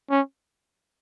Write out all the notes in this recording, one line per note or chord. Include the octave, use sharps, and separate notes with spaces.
C#4